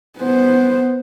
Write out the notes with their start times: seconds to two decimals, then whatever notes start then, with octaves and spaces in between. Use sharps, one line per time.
0.18 B3 C5